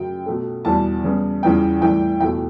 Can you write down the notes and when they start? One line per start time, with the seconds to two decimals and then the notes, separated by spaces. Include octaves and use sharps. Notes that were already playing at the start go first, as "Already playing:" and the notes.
Already playing: F#2 C#3 F#3 G5
0.26 B2 A3
0.65 E2 B2 G3 A5
1.04 C#3 G3 B3
1.43 E2 C#3 E3 G3 B3 G5
1.82 A2 E3 G3 G5
2.20 E2 B2 A3 G5